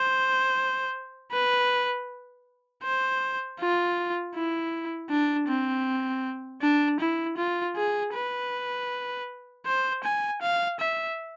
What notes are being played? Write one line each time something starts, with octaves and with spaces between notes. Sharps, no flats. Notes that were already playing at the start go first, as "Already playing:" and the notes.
Already playing: C5
B4
C5
F4
E4
D4
C4
D4
E4
F4
G#4
B4
C5
G#5
F5
E5